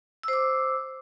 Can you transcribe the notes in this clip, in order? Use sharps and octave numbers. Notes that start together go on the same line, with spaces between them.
C5 D6 E6